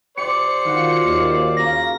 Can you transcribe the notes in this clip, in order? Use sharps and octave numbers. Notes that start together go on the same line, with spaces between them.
G4 C5 D5 C#7
D#3 F4 F#4 F#5
D#2
C#3 A#3 C#4 A#6